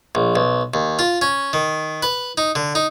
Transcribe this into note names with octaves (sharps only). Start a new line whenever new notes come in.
A#1
B1
D#2
F4
C#4
D#3
B4
D#4
D3
D#4